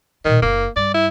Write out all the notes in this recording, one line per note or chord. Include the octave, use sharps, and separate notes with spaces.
A#2 D#3 A#3
F#1 A#3 E4
G2 D5
E4